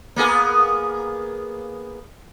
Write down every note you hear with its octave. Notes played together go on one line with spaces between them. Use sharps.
A#3 B3 G#4